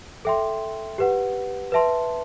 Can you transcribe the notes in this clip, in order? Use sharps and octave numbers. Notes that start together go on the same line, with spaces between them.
A4 E5 G5 C6
G4 B4 F#5
B4 E5 A5 C6